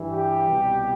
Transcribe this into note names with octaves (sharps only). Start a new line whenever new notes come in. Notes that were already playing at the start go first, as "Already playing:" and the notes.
Already playing: G2 E3 G3
G4
C2 B2 G3